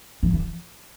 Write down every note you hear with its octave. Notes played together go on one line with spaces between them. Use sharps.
E3
E3